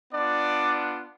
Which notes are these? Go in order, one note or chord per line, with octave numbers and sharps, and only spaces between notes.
B3 D4 F4 D5